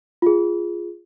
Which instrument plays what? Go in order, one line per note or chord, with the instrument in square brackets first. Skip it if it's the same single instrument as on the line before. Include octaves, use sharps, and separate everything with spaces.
[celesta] F4 G#4